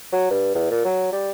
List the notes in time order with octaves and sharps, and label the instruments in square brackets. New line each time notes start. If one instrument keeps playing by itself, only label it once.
[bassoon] F#3
G2
E2
A#2
F#3
G3